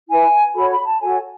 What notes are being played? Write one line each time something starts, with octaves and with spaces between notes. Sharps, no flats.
E4 B4 G#5
F#4 A4 C#5 B5
B5
A5
F#4 A4 C#5 G#5